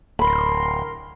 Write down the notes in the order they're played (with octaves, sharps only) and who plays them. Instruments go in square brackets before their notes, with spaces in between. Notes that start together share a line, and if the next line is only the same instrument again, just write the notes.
[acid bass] D1 [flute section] A#4 C6 [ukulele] B5